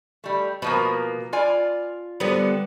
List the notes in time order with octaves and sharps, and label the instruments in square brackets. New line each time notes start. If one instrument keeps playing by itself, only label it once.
[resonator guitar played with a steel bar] G3 A3
[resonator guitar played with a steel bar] B2 F3 A#3 [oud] B4
[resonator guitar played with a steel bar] F4 D5 G#5
[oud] D3 G3 B3